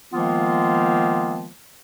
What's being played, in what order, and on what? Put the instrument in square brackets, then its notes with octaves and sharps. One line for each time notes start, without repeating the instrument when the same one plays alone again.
[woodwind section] D#3 F3 G#3 A#3 B3 F4